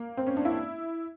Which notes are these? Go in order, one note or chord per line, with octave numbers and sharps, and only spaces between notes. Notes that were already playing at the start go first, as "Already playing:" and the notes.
Already playing: A#3
C4
C#4
D4
E4